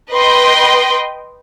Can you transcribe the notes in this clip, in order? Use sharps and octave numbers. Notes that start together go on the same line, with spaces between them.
B4 D#5 G5 C6